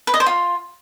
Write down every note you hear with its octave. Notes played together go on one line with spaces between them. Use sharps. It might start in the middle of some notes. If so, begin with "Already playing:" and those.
B4
D#5
C5
F4